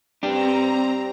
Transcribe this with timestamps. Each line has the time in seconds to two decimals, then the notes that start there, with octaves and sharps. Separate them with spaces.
0.23 C4 D4 G4 A#5